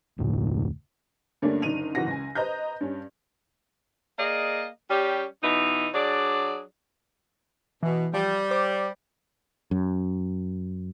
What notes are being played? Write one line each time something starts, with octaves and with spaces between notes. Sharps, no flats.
F1 D2 A2
G2 D3 A3 A#3 C#4 D4
F#1 D3 D#4 D#7 F7
F#1 E3 F#4 F#5 A#6
C#2 G#5
B4 C5 D#5 A#5 G6
G2 C#4
A#3 G#4 D5 D#5
G3 C#4 G4
B2 E3 D#4
F#3 D4 G#4 D5
B2 E3
F3 G3
C5 D6
F#2